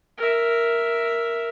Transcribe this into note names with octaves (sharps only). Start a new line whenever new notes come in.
A#4 E5